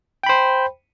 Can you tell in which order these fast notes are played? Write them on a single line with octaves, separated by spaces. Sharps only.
G5 B5 C5